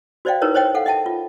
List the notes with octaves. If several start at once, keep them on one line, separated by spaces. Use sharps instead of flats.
F#4 C5 D5 D#5 F5 G5
D#4 E4 A#4 B4 C#5 D#5
C5 C#5 D#5 G5
A4 F5 F#5
D#5 E5 G5 A5
F4